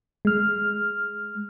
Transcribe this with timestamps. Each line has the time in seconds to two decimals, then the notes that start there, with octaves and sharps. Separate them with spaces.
0.25 G#3 F6